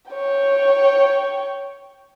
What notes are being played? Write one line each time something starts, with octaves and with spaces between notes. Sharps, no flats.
C#5 G5